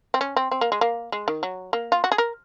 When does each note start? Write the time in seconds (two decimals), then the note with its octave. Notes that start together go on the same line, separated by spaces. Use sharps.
0.14 C4
0.21 C#4
0.36 C4
0.51 C4
0.61 A#3
0.72 G#3
0.81 A#3
1.12 G#3
1.28 D#3
1.43 F#3
1.73 A#3
1.92 F4
2.04 F#4
2.12 G#4
2.18 A#4